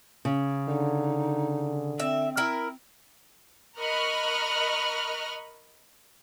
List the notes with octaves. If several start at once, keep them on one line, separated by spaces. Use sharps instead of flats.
C#3
D3 D#4
C4 E5
E4 A#4
A#4 D#5 B5 C#6 F6 F#6